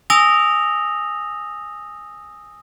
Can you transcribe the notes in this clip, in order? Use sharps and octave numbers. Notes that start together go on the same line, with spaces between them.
G#5 D#6 E6 A#6 F7 G7